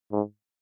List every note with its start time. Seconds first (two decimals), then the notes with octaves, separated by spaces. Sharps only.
0.12 G#2